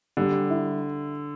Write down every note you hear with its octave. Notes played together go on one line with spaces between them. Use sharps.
D3 G3
E4